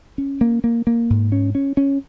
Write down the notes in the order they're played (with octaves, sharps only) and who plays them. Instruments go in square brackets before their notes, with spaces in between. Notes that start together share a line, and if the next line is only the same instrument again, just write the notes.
[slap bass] C#4
A#3
A#3
A#3
G#2
C#4
C#4
C#4